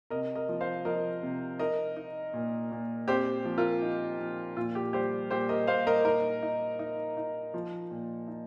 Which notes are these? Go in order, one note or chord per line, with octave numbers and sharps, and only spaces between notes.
C3 A#4 D#5
A#4 D#5
F3
C5 F5
F3 A#4 D#5
C3
D#4 A#4 D#5
D#4
A#2
A#2
C4 G4 C5
F3
F4 A#4
D#4
F3
A#2 F4
G4
G3 G4 C5
A#2 G4 C5
A#4 D#5
A#2 C5 F5
A#4 D#5
D#4 A#4 D#5
D#4
D#4
D#4
F3
A#2
D#4